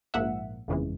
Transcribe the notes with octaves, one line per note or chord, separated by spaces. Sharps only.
A#1 G#2 F3 A#3 E5 F#5
G1 F2 C#3 E3 G#3